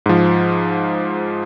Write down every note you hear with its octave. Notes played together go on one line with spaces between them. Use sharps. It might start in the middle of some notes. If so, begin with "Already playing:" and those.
G#2 F3